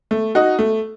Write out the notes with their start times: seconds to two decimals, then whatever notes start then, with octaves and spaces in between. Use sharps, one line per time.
0.11 A3
0.35 D#4 F#4
0.59 A3